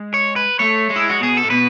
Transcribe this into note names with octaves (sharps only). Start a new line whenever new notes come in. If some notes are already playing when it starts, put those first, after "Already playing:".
Already playing: G#3
C#5
B4
A3 C#5
G#3
E4
F#4
B2 G#4
A4
A2
B2 B4